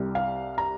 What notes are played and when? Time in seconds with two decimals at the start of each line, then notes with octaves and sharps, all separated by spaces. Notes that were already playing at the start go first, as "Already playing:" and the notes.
Already playing: C2 C3 G3
0.15 F5
0.58 A#5